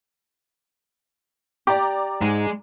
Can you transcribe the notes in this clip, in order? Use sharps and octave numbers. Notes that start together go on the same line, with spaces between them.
G4 D5 A#5 D6
G#2 G#3